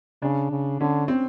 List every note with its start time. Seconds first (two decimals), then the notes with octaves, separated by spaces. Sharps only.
0.22 C#3 D4
0.51 C#3
0.80 D3 C#4
1.08 C4